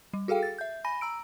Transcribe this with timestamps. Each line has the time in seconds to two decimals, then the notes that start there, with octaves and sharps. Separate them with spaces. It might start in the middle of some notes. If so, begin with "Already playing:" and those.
0.13 G3
0.28 F#4 G#4 A4 F5 G5
0.43 A6
0.58 E5 G6
0.84 G#5 B5 A#6 D#7
1.01 A#5 E6 D7